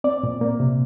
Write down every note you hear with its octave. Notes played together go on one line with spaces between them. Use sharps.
C4 D5
A#2
A#3
C3